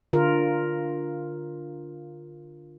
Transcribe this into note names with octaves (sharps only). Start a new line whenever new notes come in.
D3 F4 A#4